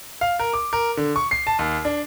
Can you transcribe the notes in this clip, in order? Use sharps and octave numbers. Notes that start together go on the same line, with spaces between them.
F5
A#4
D6
A#4
D3
C#6
C7
A5
D#2
D4